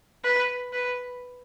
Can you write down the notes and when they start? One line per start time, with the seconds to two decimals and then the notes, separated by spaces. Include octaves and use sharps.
0.24 B4
0.73 B4